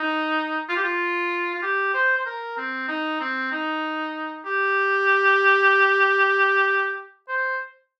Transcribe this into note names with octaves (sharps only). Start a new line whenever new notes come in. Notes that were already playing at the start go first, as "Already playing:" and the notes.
Already playing: D#4
F4
G4
F4
F4
G4
C5
C5
A#4
C4
D#4
C4
D#4
G4
C5